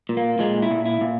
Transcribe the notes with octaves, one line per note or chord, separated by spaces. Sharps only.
A#2
A#3
A#2 G#3
E4
A#2
E4
A#2